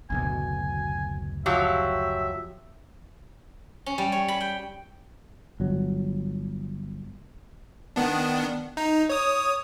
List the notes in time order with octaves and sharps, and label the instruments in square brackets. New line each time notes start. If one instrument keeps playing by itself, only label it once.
[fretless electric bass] F#1 D2 B2 [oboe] G#5
[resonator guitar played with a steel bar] F3 F#3 G4 [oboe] E5
[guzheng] C#4
G3
C#5
B5
G5
[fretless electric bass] G1 F#3
[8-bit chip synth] D#3 B3 D4
D#4
C#5 D#6